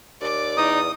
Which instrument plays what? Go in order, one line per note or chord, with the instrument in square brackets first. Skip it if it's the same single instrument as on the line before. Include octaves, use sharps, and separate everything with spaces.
[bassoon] D#2 [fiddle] D5 D6
[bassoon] E2 [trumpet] D#4 [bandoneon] D#6